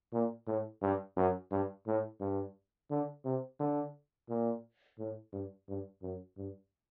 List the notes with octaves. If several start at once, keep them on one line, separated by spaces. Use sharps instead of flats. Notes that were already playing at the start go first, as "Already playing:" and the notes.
A#2
A2
G2
F#2
G2
A2
G2
D3
C3
D3
A#2
A2
G2
G2
F#2
G2